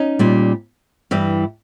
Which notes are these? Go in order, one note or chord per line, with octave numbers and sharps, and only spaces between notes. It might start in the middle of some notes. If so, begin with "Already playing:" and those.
Already playing: C#4 D#4
A#2 G3
G2 E3 G3